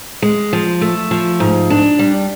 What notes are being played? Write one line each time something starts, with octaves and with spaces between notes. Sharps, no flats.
G#3
F3
A3
F3
G#2
D4
G3